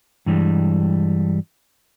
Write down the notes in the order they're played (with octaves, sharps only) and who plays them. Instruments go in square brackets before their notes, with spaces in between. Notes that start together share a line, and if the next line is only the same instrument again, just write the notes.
[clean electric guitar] G2 E3 G3 G#3